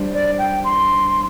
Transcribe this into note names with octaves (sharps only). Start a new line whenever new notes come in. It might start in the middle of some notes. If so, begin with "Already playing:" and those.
Already playing: G3 D4 G4 C5
D5
G5
C6